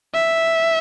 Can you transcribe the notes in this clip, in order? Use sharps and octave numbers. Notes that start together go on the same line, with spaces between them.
E5